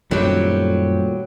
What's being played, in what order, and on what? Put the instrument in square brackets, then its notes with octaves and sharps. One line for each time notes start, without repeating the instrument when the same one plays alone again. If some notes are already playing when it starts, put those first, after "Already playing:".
[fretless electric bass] F#2 D#3 [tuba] A#2 [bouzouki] F#3 G4 [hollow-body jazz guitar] G3 A3 C4